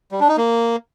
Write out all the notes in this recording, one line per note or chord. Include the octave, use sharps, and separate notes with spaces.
G3
D4
D#4
A#3